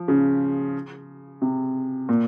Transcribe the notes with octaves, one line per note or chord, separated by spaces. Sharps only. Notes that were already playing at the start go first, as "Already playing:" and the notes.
Already playing: F3
C#3
C3
A#2